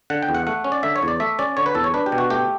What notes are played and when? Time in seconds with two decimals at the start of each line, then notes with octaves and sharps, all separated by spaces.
0.10 D3 F#5
0.23 G5
0.29 E2
0.35 F#5
0.47 A3 F#5
0.64 C#4
0.72 D5
0.83 D3 E5
0.96 C#5
1.02 E2
1.08 D5
1.20 A3 E5
1.39 C#4 D5
1.57 D3 C#5
1.66 B4
1.75 E2 A4
1.84 C#5
1.94 D4 B4
2.06 G4
2.12 B2
2.18 F#4
2.30 A3 G4